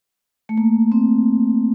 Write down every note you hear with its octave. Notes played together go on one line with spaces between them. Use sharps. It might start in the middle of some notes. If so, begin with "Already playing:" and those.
A3
A#3
C4